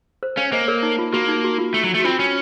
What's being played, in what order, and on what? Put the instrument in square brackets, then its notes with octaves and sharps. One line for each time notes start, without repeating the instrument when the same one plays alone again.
[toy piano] C5
[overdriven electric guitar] C#4 [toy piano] C#5 F5
[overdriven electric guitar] A#3 [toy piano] C5 D#5
[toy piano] A#4 C#5
D#4
F4
[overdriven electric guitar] A#3 [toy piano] F#4
[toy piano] D#4
F#4
F4
[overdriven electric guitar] A3
F#3
A3
[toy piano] F#4
[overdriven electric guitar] C4 [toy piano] F4
[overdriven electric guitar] C#4